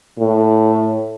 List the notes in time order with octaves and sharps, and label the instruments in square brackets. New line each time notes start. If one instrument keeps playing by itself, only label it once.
[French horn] A2